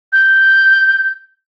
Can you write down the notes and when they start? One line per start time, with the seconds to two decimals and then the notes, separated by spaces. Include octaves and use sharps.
0.13 G6